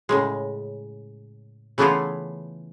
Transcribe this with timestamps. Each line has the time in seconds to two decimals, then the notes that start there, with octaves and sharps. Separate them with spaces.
0.09 A2 C#3 G#3
1.78 C#3 E3 A3 B3 E4 F4